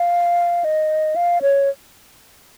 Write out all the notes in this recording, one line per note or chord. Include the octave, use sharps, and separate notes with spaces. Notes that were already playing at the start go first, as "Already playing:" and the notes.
Already playing: F5
D#5
F5
C#5